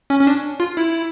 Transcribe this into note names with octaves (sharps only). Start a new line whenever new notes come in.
C#4
C#4
D4
F4
E4